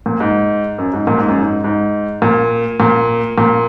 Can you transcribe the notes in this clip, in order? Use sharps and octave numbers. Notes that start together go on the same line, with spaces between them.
A#2
G#2
F#2
G#2
A#2
G#2
F#2
G#2
G#2
A#2
A#2
A#2